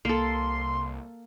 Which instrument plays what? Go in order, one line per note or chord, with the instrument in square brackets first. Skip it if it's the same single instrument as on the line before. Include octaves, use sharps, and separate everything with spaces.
[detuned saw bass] C2 [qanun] A#3 A4 [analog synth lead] C6